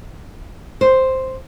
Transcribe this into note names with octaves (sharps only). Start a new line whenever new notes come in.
C5